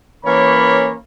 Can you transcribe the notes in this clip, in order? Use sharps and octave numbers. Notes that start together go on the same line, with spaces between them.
E3 A#3 C#4 A#4 C#5 B5